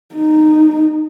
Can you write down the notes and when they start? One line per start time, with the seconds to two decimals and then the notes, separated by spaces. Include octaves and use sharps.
0.15 D#4